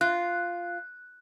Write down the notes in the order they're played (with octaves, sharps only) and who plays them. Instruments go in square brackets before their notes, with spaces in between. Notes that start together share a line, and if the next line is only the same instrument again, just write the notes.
[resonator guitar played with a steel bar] F4 [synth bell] F#6